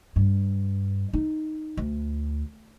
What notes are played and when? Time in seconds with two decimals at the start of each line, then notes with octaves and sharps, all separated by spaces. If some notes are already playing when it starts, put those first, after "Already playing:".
0.16 G2
1.13 D#4
1.77 D2